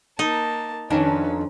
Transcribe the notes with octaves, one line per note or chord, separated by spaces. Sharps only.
A#3 D#4 A5
F2 D#3 C#4 D4 B4